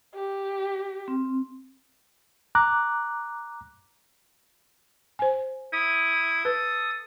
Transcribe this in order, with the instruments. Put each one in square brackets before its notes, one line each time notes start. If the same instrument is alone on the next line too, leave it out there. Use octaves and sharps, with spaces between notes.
[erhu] G4
[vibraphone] C4
[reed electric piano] A#5 D6 F#6
[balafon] C5 G#5
[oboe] E4 [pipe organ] D#6
[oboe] A4 [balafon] B4